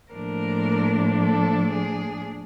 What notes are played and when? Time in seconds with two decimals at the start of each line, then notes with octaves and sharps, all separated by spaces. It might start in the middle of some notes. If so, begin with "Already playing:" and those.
0.13 A2 F3 A#3 D4 A#4
1.18 A4
1.71 G#4